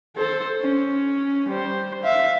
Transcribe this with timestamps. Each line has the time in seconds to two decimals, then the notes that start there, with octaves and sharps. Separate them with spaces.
0.16 A4 C5
0.61 C#4
1.48 G3 C5
2.03 E5 F5